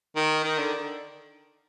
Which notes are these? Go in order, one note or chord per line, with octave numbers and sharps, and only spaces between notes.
D#3
D#3
D3